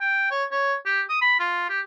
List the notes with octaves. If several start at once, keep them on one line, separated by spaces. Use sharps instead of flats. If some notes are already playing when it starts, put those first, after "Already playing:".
G5
C#5
C#5
G4
D#6
B5
F4
G4